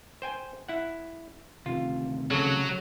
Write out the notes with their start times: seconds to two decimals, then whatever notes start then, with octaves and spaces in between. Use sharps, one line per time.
0.22 C5 G5 G#5
0.68 E4 F#5
1.66 D2 C3 D#3 F4
2.31 C#3 F#3 A4